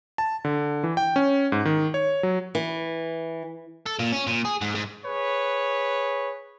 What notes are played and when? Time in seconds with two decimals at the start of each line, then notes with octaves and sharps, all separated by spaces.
0.18 A5
0.45 D3
0.84 E3
0.97 G5
1.16 C#4
1.52 G#2
1.65 D#3
1.94 C#5
2.23 F#3
2.55 E3
3.86 A4
3.99 A#2
4.12 C#4
4.27 A#2
4.45 G#4
4.61 G#2
4.75 G#2
5.05 G#4 B4 C#5